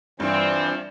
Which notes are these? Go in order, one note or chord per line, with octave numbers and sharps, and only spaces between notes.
G2 E3 F3 C4 D5